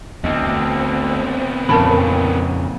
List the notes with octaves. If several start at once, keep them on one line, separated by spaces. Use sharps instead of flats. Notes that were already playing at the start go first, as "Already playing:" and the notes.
D2 B3 C4 D#5
F2 A#2 C#3 A#4 A5 B5